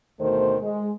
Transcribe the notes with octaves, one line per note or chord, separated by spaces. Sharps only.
D2 B2 D#3 A3 C5
G#3